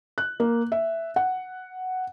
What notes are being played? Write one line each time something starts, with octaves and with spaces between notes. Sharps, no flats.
F#6
A#3
E5
F#5